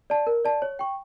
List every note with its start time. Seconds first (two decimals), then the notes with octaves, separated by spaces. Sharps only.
0.10 D5 A5
0.27 A#4
0.45 D5 A5
0.62 C#5
0.79 G5 C#6